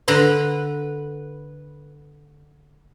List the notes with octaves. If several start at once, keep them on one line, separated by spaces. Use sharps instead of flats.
D3 B4 A#5 C6